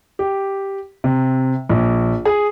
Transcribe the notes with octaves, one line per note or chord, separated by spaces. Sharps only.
G4
C3
A#1
G#4